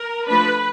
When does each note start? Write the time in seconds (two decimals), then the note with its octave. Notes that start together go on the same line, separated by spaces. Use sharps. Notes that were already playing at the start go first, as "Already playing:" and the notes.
Already playing: A#4
0.27 F3 A3 D4 B4